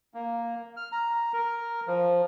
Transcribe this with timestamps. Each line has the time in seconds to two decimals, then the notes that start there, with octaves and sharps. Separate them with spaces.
0.14 A#3
0.77 F6
0.92 A#5
1.33 A#4
1.87 F3